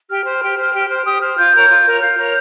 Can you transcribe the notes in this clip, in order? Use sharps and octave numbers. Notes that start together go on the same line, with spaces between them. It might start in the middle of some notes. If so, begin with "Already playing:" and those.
G4 F6
C5
G4
C5
G4
C5
G4 D#6
C5 F6
F4 G6
A#4 C#5
F4
A#4 C#5
F4 G6
A#4 C#5